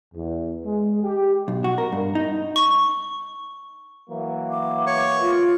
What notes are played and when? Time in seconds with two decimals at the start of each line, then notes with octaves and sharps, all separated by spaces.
0.15 E2
0.65 G#3
1.03 G4
1.48 B1
1.64 F#4
1.78 A#4
1.92 G2
2.15 D#4
2.56 C#6
4.10 E3 F#3 A#3
4.50 D6
4.87 C#5 C#6
5.21 F4